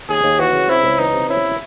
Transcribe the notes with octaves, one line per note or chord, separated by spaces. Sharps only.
D#2 G#4
D#2
E3 F#4
C#3
C4 E4
C#2
E3 D#4
C3
C#4 E4